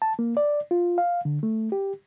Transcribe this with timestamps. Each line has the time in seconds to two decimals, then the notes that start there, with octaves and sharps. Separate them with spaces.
0.02 A5
0.19 A#3
0.37 D5
0.71 F4
0.98 F5
1.25 D3
1.43 A3
1.72 G4